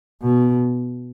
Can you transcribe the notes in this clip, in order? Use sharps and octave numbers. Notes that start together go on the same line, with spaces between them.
B2